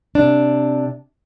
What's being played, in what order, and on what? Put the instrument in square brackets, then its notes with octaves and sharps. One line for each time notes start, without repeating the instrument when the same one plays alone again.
[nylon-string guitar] C3 D4